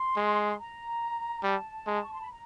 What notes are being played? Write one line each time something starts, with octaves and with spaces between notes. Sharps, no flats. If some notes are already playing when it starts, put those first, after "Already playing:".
Already playing: C6
G#3
A#5
G3 A5
G#3
C#6
C6
B5
A#5